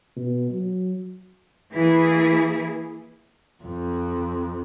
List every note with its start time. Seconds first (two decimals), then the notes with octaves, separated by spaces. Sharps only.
0.16 B2
0.50 F#3
1.74 E3 A#3 E4 G#4
3.63 F2